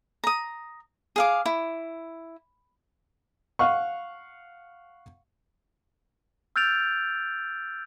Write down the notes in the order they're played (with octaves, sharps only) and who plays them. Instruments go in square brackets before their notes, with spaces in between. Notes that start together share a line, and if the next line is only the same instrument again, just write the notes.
[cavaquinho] A#5 D#6
G#4 F5 D6
E4
[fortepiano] F5 F#5 C#6
[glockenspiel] E6 F6 G6 A6 D7 F7